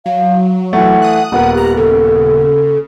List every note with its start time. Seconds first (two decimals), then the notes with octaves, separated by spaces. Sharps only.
0.06 F#3 F5
0.73 E3 A3 F#5
1.02 D#6 F#6
1.32 D#1 B3 A#4 F#5
1.54 G4 A#5 F#6
1.77 C#3 A4